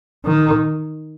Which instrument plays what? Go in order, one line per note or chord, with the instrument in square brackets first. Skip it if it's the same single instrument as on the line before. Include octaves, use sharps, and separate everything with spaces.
[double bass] D#3